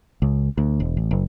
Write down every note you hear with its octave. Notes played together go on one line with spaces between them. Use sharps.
C#2
D2
E1
A1
F#1